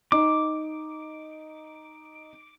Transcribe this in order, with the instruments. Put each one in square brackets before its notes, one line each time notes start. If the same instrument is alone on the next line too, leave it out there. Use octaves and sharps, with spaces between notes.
[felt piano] D#4 [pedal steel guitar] D6